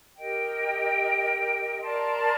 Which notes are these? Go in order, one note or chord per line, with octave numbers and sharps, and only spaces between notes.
G4 A#4 D#5 G5
A#4 D5 A5 C6